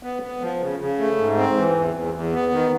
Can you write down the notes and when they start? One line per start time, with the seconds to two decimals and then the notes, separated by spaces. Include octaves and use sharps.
0.03 B3
0.22 B3
0.42 F3
0.61 C#3
0.80 C#3
0.99 A3
1.18 G#2
1.37 C4
1.56 E3
1.76 E2
1.94 E2
2.14 E2
2.33 B3
2.52 D#3